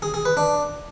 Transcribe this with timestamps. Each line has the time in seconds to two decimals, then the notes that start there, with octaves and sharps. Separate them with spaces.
0.02 G#4
0.14 G#4
0.25 B4
0.37 D4